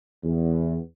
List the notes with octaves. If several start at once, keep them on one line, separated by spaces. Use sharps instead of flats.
E2